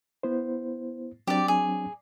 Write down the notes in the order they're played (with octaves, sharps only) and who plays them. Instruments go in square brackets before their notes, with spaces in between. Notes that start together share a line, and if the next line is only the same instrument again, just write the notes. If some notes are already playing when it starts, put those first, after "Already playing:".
[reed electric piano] B3 E4 C5
[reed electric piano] F#3 C4 D4 [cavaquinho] G4 D5
[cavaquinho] G#4